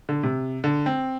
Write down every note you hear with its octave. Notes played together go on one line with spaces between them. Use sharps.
D3
C3
D3
C4